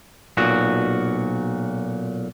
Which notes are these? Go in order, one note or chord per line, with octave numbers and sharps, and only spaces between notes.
B1 A#2 F#4